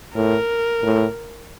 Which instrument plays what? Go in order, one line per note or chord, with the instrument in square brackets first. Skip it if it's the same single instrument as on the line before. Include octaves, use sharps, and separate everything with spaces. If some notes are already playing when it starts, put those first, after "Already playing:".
[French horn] A2 [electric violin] A#4
[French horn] A2